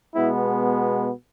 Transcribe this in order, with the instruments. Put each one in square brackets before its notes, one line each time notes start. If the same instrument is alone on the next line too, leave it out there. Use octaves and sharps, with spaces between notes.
[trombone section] B2 G#3 B3 E4